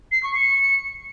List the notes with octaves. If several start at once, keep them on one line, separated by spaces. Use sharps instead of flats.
C7
C#6
C#7